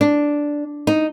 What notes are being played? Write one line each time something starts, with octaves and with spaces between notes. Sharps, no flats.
D4
D#4